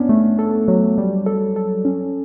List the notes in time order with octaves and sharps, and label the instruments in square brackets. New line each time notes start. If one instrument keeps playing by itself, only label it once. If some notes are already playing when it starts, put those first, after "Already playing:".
Already playing: [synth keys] B3 [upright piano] C#4 D4
[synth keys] A3
A4
F#3
G3
A4
A4
C#4